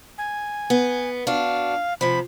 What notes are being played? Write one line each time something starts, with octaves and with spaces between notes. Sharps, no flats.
G#5
B3
D4 F#4 F5
C3 F3 B5